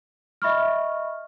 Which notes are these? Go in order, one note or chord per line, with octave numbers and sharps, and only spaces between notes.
D#5 E5 B5 C#6 F6